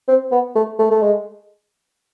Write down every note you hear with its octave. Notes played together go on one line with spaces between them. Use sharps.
C4
B3
A3
A3
A3
G#3